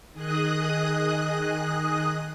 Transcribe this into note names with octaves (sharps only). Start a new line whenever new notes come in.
D#3 G#4 D#5 D#6 F#6